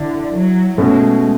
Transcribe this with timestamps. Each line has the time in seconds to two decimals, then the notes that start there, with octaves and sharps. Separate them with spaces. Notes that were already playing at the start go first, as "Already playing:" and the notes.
Already playing: D3 E4
0.33 F#3
0.78 B2 G#3 A3 C#4